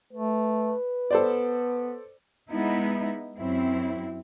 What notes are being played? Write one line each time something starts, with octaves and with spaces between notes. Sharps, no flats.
A3 B4
B3 A4 C5 D5
G#3 B3 D#4 E4
F#2 C4 E4